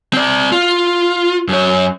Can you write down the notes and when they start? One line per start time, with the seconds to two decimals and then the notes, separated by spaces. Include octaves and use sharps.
0.13 C4 D5
0.52 F4
1.48 F#2 C#5